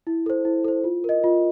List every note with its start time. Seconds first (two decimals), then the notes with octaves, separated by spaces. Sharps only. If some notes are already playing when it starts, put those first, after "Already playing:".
0.07 E4
0.26 A4 C5
0.45 E4
0.64 A4 C5
0.84 F4
1.04 A#4 D#5
1.24 F4